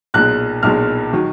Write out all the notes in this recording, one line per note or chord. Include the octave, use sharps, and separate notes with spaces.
B1 A#2 G#3 F#6
B1 A#2 G#3 F6
D#3 F#3